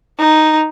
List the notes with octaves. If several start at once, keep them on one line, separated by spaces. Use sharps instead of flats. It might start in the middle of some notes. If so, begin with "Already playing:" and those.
D#4